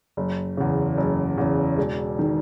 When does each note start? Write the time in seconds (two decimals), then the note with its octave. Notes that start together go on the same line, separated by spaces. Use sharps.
0.17 F#1
0.57 E2 C#3
0.98 F#1
1.38 E2 C#3
1.78 E1
2.19 D#3